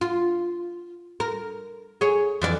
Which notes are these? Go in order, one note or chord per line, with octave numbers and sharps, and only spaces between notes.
F4
A#4
G#4 C#5
F2 E3 D5